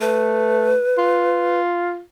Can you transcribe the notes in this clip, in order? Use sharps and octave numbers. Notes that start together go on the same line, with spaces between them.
A3 B4
F4